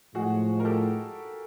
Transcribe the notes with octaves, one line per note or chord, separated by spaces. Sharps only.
A2 F3 G#3 F#4 G#4
A#4
G4 A4